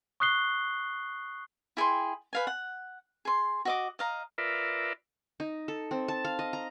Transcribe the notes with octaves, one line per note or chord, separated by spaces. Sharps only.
C#6 D#6 F#6 C7 G7
E4 G#4 G5 C6
B4 F5 G#5
F#5
G#4 C6
F#4 D#5 D6
D#5 F5 A#5
F4 A#4 B4 D5 E5
D#4
A4
C4
A5
F5
D#5
A#5